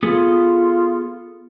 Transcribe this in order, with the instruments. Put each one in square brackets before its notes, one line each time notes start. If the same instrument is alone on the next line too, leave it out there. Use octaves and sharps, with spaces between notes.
[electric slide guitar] B3 G#4 A4 [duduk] F4